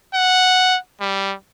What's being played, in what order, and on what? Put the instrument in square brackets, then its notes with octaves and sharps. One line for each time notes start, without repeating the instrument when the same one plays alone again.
[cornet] F#5
G3